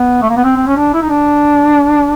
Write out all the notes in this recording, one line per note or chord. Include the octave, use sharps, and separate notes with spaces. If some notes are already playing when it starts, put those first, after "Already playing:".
Already playing: B3
A3
A#3
B3
C4
C4
C#4
D4
E4
D#4
D4